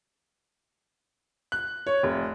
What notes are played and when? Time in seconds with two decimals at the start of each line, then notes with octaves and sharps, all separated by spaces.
1.52 F#6
1.87 C#5
2.03 F1